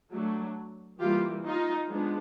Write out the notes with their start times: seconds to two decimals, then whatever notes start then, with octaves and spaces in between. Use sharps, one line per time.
0.11 F#3 A3 D4
0.99 E3 G3 A#3 F4 G4
1.44 D#4 F4
1.88 F3 G#3 B3 D4